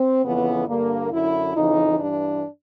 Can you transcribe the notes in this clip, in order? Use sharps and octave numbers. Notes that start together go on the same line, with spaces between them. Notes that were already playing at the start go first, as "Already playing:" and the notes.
Already playing: C4
F2 C#3 E3 B3
G2 D3 A#3
F#2 D3 E4
F2 C#3 E3 D#4
G2 E3 D4